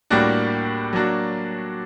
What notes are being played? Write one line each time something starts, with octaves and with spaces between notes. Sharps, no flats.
A2 G3 A#3 D4 F#4
F#3 A#3 D4 F#4